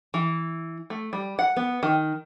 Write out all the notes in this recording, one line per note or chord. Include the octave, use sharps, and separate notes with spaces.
E3
A3
G3
F#5
B3
D#3